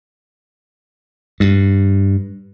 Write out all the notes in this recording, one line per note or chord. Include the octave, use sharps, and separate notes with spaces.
G2